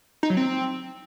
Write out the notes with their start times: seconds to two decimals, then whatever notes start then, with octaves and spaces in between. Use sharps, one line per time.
0.23 D#4
0.30 F#3
0.37 C4